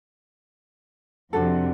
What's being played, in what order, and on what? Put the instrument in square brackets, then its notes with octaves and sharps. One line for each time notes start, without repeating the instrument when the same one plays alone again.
[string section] F2 C3 [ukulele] D4 F#4 A4